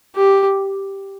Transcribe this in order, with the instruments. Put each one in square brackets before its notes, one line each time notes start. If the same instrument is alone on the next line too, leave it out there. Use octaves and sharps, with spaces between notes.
[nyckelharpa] G4